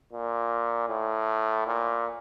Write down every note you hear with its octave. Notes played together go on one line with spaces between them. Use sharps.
A#2
A2
A#2